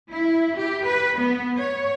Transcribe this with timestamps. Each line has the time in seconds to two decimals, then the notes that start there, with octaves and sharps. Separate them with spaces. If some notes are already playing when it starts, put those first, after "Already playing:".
0.10 E4
0.55 G4
0.85 B4
1.16 B3
1.57 C#5